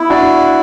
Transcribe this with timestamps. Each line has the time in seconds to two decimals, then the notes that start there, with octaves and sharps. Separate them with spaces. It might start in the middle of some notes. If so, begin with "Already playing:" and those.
Already playing: B3 E4
0.09 D4 F#4